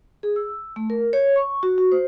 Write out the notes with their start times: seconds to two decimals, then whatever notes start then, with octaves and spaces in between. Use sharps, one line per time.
0.23 G#4
0.36 E6
0.76 A3
0.90 A#4
1.13 C#5
1.36 C#6
1.63 F#4
1.78 F#4
1.92 C5